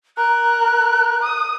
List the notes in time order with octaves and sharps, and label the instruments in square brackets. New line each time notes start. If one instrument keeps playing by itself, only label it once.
[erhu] A#4 [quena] F#6
[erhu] D#6